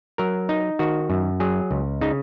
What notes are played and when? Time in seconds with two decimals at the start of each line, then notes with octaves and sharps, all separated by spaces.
0.18 F#3 A#4
0.49 D#4
0.79 D#3 F#4
1.10 F#2
1.40 F#3 G#4
1.71 C#2
2.01 C#3 D#4